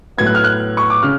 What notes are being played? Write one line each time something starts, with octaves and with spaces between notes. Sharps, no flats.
A2 F#3 B3 G#6
F#6
F6
F#6
C#6
D6
C#3 F6